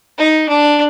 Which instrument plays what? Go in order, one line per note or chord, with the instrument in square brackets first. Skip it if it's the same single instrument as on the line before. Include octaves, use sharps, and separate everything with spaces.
[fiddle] D#4
D4